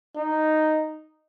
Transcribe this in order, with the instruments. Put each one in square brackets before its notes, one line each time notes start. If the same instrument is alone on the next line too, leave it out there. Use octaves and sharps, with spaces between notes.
[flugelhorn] D#4